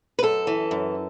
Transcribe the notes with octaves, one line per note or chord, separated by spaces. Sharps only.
B4
F#2 A4
E3
F#2